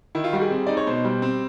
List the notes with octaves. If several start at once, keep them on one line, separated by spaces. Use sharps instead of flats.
D#3 E4
F4
G3 F#4
G#4
C4
D#4 D5
C#5
B2 C5
G3
C4